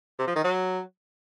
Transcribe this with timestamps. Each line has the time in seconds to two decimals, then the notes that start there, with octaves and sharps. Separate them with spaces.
0.19 C3
0.27 F3
0.36 D#3
0.44 F#3